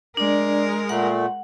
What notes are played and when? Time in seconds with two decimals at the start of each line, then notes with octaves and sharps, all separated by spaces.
0.17 G#3 D4 A#4 D5
0.89 A#2 A3 F#5